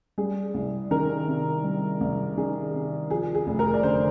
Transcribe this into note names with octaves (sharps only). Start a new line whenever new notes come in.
G3 G#4
C2
D#3 A#4
C3
G3
C2
D#3 G#4
C3
F3 G#4
G#4
F1
A#4
D5
D3 C5